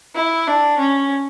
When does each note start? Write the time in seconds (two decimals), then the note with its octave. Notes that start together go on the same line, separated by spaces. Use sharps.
0.15 E4
0.48 D4
0.78 C#4